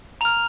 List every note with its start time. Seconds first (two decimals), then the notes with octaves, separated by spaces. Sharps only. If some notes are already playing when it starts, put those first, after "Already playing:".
0.21 A#5 F6 F7